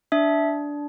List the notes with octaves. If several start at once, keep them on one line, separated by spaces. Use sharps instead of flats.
D4 E5